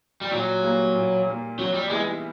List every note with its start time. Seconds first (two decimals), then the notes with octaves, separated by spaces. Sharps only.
0.21 G3
0.31 A#2 F#3
0.63 G3 A#3
0.95 A#2
1.27 G3 A#3
1.58 C3 F#3
1.74 G3
1.90 E3 G3 G#3 B3 E4